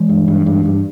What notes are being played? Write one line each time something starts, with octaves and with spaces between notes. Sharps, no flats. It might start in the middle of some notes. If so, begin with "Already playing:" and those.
Already playing: E3 G#3
G2
G2
G2
G2